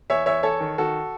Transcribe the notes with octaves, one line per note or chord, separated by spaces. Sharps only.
E2 C#5 E5
E2 C#5 E5
E2 A4 C#5
D#3
D#3 F#4 A4